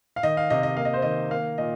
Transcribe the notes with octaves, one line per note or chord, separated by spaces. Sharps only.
F5
D#3 D#5
F5
C3 D#5
D#5
A#3 F5
D#5
C5
D#3 D#5
A#3 F5
A#2 D#5